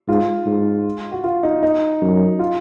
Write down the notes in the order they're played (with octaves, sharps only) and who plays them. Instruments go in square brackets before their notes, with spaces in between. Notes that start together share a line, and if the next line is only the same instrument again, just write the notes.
[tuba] G#2 [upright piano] F4
[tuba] G#2
[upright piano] F#4
F4
D#4
D#4
[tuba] F#2
[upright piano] F4